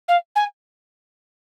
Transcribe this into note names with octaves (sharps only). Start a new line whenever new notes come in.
F5
G#5